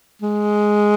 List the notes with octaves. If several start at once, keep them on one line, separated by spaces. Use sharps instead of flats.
G#3